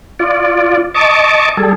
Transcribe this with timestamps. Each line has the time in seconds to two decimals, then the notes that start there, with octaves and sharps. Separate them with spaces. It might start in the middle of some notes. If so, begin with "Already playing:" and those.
0.19 F4 D5
0.94 D#5 A5 C#6 D6
1.57 G3 G#4 A4